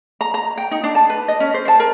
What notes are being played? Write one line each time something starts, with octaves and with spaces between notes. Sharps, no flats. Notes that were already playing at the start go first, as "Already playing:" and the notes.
A#5
A#5
G5
D#4
D4
A5
B4
D#5
C#4
C5
A5
A#4